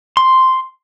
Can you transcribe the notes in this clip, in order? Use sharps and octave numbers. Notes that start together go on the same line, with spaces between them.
C6